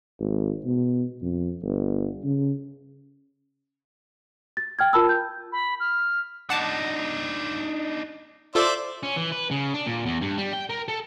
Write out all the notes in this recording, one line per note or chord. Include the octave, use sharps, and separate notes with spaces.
G#1
B2
F2
G1
C#3
A6
G5 F6 G#6
F4 A#4 A5 B5 E6
G6
B5
F6
D4 D#4 F#5 A5 D6
F4 A4 C5 D5 E5 D6
C#4
E3
B4
C#3
D4
A#2
E2
G2
G3
G5
A#4
A4